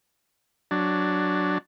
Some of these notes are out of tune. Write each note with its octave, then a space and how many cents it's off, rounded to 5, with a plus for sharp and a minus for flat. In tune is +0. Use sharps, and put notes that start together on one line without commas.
F#3 +0 D4 +0